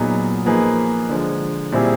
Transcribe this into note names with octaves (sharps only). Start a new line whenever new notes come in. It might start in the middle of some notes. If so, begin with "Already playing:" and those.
Already playing: A#2 F#3 B3 D#4 G#4
F3 A#3 D#4 G#4 B4
D3 F3 G#3
A#2 G3 C4 E4 G#4